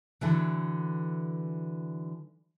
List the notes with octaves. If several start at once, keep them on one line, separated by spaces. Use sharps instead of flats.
D3 E3 F#3